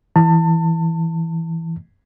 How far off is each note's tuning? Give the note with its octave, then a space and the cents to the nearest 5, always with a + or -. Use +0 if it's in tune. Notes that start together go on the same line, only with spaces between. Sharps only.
E3 +0 A5 +30